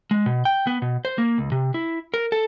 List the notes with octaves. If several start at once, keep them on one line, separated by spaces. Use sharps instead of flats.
G#3
B2
G5
B3
B2
C5
A#3
C#2
C3
E4
A#4
A4